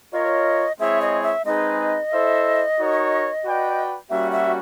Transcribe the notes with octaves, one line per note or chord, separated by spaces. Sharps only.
F4 A#4 C#5 D#5
G#3 C4 E4 G#4 C#5 E5
D#5
E5
G#3 C4 D#4 G#4 B4 D#5
E4 A4 C5 E5
D#4 F#4 A#4 C#5
F#4 B4 D5 G5
G3 A#3 C#4 F#4 E5
E5